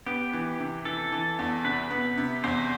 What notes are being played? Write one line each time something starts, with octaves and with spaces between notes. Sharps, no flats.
B3 G4
E3
C3
E3 A4
E3
E2
C3 B4
B3
C3
E2 C5